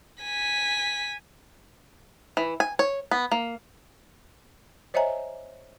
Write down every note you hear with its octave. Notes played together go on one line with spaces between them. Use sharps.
G#5 B6
E3
G#5
C#5
B3
A#3
C5 C#5 D#5 E5 G#5 A#5